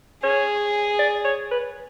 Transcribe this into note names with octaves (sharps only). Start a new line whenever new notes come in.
G#4 C#5
D5
C#5
B4